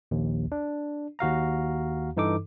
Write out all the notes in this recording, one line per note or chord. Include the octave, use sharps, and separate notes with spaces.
A#1 D#2
D4
D#2 F#4 F5 A#5
G2 E3 D#4 A4 D6